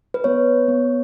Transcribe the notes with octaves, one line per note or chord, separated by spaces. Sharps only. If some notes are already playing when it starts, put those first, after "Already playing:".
B4
B3 C#5
B3